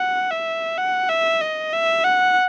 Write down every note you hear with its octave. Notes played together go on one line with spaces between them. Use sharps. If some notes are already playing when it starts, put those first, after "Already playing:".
Already playing: F#5
E5
F#5
E5
D#5
E5
F#5